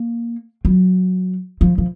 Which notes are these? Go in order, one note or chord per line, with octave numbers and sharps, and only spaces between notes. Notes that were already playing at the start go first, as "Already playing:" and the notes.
Already playing: A#3
F#3
F3
F3